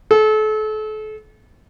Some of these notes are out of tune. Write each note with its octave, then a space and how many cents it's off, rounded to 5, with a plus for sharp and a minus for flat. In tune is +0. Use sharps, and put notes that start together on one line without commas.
A4 -35